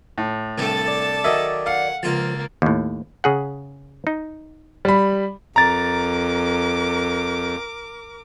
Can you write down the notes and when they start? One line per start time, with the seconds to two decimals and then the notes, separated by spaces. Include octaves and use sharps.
0.18 A2
0.58 C2 G2 G4 A4 A5
0.88 D5
1.24 D#3 F#3 D#5 E5
1.66 F5 F#5
2.03 C#2 F3 A#3 F4 A5
2.62 D#2 A2
3.24 C#3 G#4 F#5
4.07 D#4
4.85 G3 B5
5.56 F2 A#4 A#5 D6 A6